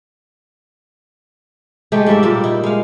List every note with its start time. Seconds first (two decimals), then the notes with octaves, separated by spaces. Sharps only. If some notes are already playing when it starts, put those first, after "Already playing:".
1.92 G#3 A3 D#4 G4
2.06 G#2 G3 A#3 E5
2.23 A#2 G3
2.44 D#4 E4
2.64 G#3 F5